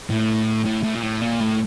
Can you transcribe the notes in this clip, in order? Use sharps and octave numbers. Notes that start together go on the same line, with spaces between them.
A2
A2
A2
A#2
A2
A#2
A2